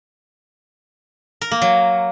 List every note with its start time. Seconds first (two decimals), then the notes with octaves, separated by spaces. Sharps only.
1.41 A#4
1.51 A#3
1.62 F#3